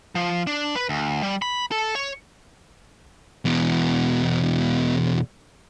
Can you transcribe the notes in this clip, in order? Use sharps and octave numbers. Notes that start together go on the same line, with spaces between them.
F3
D4
B4
D2
G3
B5
A4
C#5
E2 B2